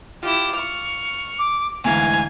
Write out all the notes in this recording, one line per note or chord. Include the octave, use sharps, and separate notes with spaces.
E4 F4 G4
C#6 F6
D6
D2 G#2 E3 F5 G#5 A#5